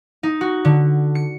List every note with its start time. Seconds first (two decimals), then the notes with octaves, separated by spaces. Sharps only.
0.23 D#4
0.41 F#4
0.65 D3
1.15 C#7